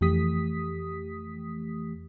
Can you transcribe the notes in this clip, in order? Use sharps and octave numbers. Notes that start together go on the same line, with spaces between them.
F2 E3 A3 G4 D#6 B6